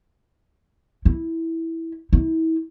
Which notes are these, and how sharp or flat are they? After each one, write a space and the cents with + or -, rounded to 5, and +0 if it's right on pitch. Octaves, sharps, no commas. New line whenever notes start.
E4 -10
E4 -35